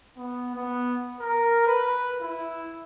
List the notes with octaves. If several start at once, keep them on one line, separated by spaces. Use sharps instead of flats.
B3
B3
A#4
B4
E4